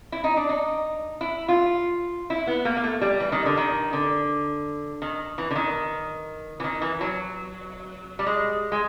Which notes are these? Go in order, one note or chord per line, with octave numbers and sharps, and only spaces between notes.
E4
D#4
D4
D#4
E4
F4
E4
B3
A#3
A#3
A3
G3
E3
D#3
D3
D#3
D3
D#3
E3
D3
D#3
E3
D#3
E3
F#3
G3
G#3
G#3